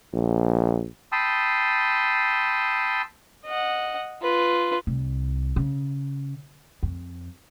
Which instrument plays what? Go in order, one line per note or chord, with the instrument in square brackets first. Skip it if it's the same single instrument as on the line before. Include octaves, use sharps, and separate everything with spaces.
[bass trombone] A#1
[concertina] G5 A5 B5 C6 D#6 E6
[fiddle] D#5 F#5
F4 B4
[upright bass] C2
C#3
F2